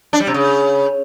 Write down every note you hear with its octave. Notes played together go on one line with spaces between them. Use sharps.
D4
G3
C3
C#3